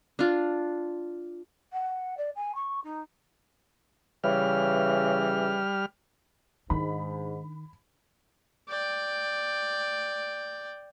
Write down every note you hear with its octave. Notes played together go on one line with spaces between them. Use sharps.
D4 F4
F#5
D5
G#5
C#6
D#4
C#3 E3 G3 F6
G#2 D#3 D4 B5
D5 G5